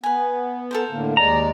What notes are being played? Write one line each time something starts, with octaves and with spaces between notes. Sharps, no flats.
B3 B4 G#5
A4 A#4 C5
A2 D3 A#3
D#2 G#3 D5 A#5